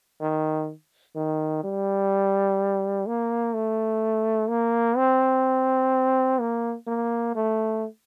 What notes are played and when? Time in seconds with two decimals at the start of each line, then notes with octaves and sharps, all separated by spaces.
0.21 D#3
1.16 D#3
1.64 G3
3.06 A#3
3.55 A3
4.49 A#3
4.97 C4
6.40 A#3
6.87 A#3
7.35 A3